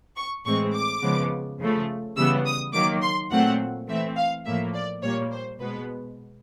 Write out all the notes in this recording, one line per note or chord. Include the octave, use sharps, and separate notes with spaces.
C#6
A2 E3 G#3 C4 C#6
D6
C#3 F3 G#3 B3
C#3 F3 A3
C#3 E3 G3 B3 E6
D#6
D#3 F#3 A#3 D6
C6
A#2 F#3 A3 C4 F#5
E3 A3 C4 E5
F5
A2 F3 A#3 E5
D5
A#2 G3 A#3 C#5
C5
B2 G#3 B3 B4